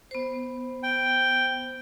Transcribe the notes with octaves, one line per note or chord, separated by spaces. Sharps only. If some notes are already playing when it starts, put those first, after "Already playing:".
B3 C5
G5